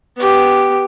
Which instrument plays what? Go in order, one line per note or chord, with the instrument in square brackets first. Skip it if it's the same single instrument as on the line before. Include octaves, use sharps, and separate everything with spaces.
[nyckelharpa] B3 G4